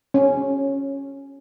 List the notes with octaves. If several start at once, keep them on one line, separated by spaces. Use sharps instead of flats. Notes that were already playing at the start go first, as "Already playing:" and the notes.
C#4